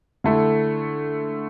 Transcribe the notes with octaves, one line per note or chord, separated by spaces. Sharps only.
D3 A3 E4 A4